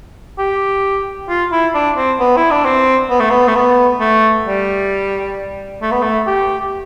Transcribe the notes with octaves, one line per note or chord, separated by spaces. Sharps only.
G4
F4
E4
D4
C4
B3
E4
D4
C4
B3
A3
B3
A3
B3
A3
G3
A3
B3
A3
G4